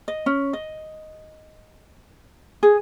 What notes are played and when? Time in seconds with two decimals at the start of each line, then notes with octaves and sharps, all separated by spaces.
0.08 D#5
0.26 C#4
0.53 D#5
2.63 G#4